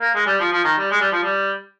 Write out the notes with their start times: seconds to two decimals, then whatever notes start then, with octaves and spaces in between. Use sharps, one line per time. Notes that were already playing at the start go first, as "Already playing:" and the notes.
0.01 A#3
0.15 G#3
0.26 G3
0.40 F3
0.52 F3
0.64 D#3
0.78 G3
0.91 G#3
1.01 G3
1.12 F3
1.23 G3